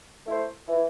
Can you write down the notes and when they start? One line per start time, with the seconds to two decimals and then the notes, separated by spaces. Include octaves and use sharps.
0.27 A3 E4 C5
0.68 E3